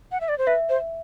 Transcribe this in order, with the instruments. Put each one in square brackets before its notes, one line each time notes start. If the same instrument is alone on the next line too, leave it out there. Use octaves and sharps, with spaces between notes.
[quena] F#5
E5
D5
C5
[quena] B4 [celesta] E5
[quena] C5